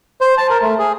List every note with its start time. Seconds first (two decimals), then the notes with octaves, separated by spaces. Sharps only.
0.21 C5
0.38 A5
0.50 A#4
0.62 A3
0.79 G#4